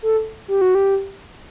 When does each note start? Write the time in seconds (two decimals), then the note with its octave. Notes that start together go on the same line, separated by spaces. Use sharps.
0.02 A4
0.48 G4
0.61 F#4
0.75 G4